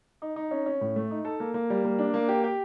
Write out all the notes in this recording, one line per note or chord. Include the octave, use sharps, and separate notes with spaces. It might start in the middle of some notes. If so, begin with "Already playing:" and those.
D#4
D#4
C#4
C#4
A2
A3
D#4
A4
A#3
A#3
G3
A#3
D4
A#3
G4
G4